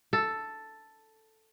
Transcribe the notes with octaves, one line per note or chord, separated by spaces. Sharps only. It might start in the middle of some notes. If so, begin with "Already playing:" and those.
A4